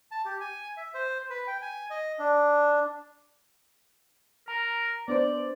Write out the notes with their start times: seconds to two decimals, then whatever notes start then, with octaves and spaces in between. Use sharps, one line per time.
0.11 A5
0.25 G4
0.41 G#5
0.77 E5
0.94 C5
1.30 B4
1.47 G5
1.62 G#5
1.90 D#5
2.19 D4
4.48 A#4 A#5
5.08 B3 D4 C5 D5